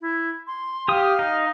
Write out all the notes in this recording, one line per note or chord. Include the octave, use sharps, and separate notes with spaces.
E4
C6
G4 F5 D#6
D#4